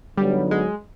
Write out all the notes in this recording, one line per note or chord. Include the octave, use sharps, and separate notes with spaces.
G2 D3 F#3 G3 B3 D#4
G#3